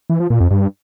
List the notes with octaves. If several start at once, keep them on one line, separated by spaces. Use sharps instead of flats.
E3
F3
A#2
F2
G2